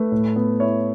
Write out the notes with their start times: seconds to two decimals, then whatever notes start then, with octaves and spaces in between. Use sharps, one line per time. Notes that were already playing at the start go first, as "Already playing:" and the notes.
Already playing: A3 B4
0.12 A2
0.36 B3
0.60 E4 C#5